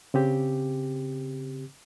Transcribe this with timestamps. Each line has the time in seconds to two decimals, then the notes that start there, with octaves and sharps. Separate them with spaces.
0.14 C#3 C4 G4